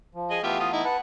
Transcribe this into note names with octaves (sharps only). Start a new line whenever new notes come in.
F3
G#4 D#5
E3 A3 B3 F4 G4 E5
F4 D#6
D#4 E4
B4 F#5 A5